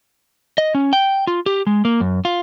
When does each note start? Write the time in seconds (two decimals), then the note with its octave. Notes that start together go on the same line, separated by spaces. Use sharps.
0.58 D#5
0.75 C#4
0.93 G5
1.27 F4
1.46 G4
1.67 G#3
1.85 A#3
2.00 F#2
2.25 F4